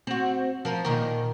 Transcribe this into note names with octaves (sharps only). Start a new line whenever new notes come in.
C4 F#4
F3 A#4
A#2 D#3 A#4